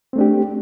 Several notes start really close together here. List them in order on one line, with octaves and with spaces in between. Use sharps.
C4 A3 D4 G4